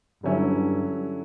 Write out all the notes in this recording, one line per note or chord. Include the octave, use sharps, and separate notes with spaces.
G2 D3 F#3 C#4 E4